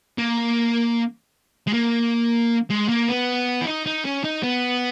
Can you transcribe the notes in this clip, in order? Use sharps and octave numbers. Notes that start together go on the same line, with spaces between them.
A#3
G#3
A#3
G#3
A#3
B3
E4
D#4
D#4
C#4
D#4
B3